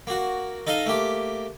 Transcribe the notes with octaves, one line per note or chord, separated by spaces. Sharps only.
A#3 F#4
D#4 A4 D#5 F5
A3 A#3 G4